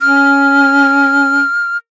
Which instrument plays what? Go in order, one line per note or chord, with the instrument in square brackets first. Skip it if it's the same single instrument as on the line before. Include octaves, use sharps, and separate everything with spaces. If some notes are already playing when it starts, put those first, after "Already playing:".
[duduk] C#4 [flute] F6